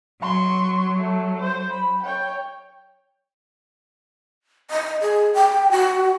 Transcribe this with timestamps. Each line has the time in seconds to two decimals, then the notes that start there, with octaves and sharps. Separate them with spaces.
0.22 F#3 C6 C#6
0.97 A3
1.40 C5
1.71 B5
2.03 C#5 G5
4.71 D#5
5.02 G#4
5.34 G5
5.72 F#4